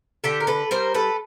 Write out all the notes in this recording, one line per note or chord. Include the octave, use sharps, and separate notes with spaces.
D3 G4 A4
A#4
A4 B4
G3 A#4 C5
A4 B4